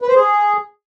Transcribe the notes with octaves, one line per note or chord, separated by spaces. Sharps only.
B4
C5
G#4